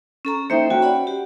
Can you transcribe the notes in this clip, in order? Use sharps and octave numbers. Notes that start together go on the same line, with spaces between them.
C#4 A4 A#5
A#3 D#4 C5 E5 G5
C#4 F#4 G5
D5 F#5 B5
G4